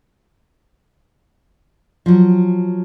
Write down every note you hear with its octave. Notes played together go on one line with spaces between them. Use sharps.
F3 F#3